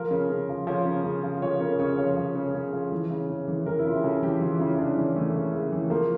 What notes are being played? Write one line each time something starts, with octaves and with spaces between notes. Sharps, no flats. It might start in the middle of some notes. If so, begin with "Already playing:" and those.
Already playing: F3 A#4
C#3
C#3
F3
F3 C#5
C#3
C#3
F3
F3 C#5
C#3 A#4
C#3 C#5
F3 C#5
F3
C#3
C#3
F3
E3
C#3
C#3
E3
E3 A#4
E4
C#3 F4
G4
C#3 A4
E3 G4
E3 F4
C#3 E4
C#3 D4
E3 C#4
E3 A3
C#3
C#3
E3
F3 A#3